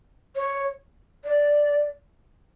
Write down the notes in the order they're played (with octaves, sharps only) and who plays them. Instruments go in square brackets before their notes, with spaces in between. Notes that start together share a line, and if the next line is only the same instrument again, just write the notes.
[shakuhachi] C#5
D5